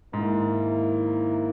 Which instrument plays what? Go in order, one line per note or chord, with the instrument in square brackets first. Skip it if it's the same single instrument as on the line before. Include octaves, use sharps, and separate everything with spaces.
[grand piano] G#2 [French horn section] D#3 A#3 E4